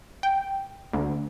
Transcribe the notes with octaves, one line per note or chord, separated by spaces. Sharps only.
G5
D2